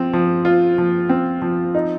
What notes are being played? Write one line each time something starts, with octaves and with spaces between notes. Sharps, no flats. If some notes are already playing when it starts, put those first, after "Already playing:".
Already playing: F3 C4
F3
F4
F3
C4
F3
D#4